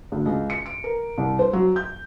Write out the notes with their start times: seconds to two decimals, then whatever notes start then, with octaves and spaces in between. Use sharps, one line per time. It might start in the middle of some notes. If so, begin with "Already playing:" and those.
0.12 D2
0.26 C#2
0.50 C#7
0.66 D7
0.84 A#4
1.18 C2
1.39 C5
1.53 F#3
1.76 G6